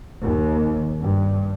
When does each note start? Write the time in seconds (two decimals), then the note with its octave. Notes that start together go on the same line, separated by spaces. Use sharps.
0.21 D#2
1.00 G2